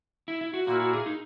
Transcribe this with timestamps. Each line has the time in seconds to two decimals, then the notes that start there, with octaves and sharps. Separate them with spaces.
0.28 E4
0.41 E4
0.54 F#4
0.66 A#2 A#3 E4 F#4 A#4
0.80 F#4
0.93 G#4
1.06 D#4